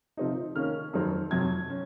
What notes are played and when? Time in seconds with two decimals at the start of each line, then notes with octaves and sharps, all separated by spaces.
0.17 C3 F3 C4 D#4
0.55 D#3 A#3 C#4 F6
0.93 F2 D#3 F#3 C4
1.31 F2 C3 F#3 G#6
1.70 C#4